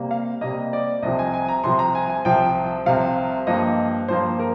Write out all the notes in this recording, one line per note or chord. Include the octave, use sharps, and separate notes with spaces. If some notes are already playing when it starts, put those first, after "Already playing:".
Already playing: C3 G3 A#3
F5
C3 G3 A#3 D#5
D5
C2 C3 F3 D#5
G#5
G#5
A#5
C2 C3 F3 C6
A#5
G#5
G#5
C2 C3 F3 G5
C2 C3 F3 F5
G2 F3 A#3 D#5
G2 F3 A#3 C5
A#4